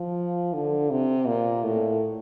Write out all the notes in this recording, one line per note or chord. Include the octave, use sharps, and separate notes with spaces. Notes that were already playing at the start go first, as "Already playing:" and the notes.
Already playing: F3
D3
C3
A#2
A2